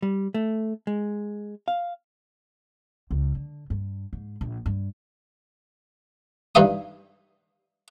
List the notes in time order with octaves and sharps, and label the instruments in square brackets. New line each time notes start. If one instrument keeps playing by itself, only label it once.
[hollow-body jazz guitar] G3
A3
G#3
F5
[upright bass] C#2
D3
G2
G#2
A#1
G2
[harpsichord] G2 E3 D#4 E5 F5 D#6